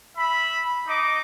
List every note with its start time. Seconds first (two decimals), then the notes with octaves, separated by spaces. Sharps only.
0.16 E5 B5
0.87 D#4 D#5 D6